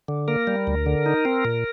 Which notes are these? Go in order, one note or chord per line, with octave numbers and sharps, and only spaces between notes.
D3
A#3 A#4
G3
D2
D3
D#4
C4
A#2